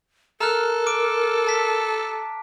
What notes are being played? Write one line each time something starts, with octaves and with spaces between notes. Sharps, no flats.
A4 A#4 A#5 F6 F#6
D6 D7
A5 B6